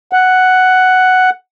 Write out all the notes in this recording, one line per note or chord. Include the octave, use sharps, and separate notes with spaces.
F#5